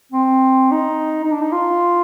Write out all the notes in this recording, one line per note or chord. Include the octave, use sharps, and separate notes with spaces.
C4
D#4
D#4
D4
D#4
F4